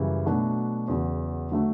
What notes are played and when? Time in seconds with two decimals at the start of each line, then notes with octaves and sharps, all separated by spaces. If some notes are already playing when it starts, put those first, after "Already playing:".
Already playing: F#2 C#3 E3 G3
0.25 B2 F#3 A3 D4 F#4
0.88 E2 C#3 F#3
1.52 D3 F#3 A3